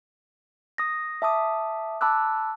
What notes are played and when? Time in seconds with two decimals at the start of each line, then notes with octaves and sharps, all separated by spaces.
0.78 D#6 A#6
1.22 E5 A5 D6 D#6
2.01 A5 B5 D6 E6 F#6